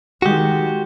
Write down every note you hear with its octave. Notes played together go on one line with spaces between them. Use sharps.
D#3 G#3 F#4 G4